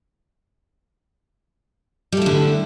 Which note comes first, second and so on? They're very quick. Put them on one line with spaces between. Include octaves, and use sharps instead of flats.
G3 A3 E4 D3